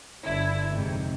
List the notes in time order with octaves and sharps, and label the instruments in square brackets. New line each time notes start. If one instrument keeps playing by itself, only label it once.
[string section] G1 D3 E4
F2 G#2 C3